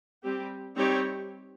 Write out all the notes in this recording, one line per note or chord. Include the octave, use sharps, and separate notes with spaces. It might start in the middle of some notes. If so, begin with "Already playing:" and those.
G3 C4 G4
G3 C4 D#4 G4 C#5